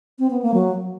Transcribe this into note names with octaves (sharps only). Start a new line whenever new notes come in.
C4
B3
A#3
F#3